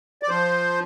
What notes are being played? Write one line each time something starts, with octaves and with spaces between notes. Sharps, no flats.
D5
F3 C5